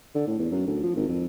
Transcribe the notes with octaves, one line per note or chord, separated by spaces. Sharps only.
D3
A2
E2
F#2
D2
F3
G#1
F2